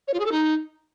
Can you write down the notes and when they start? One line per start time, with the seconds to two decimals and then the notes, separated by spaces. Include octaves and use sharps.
0.08 C#5
0.14 F4
0.20 G#4
0.26 A4
0.32 D#4